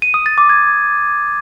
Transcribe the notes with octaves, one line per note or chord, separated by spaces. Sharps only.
D#7
D#6
A6
D6
G#6